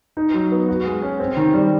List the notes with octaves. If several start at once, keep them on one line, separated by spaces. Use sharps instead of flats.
D#4
F#3
B3
F#4
G#3
C#4
C4
D#3
G3